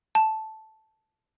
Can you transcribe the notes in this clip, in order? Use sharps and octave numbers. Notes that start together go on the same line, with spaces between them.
A5